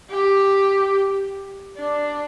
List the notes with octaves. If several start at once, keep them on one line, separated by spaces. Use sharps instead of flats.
G4
D4